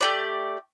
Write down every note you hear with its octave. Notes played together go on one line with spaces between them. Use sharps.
A3 D4 G4 D5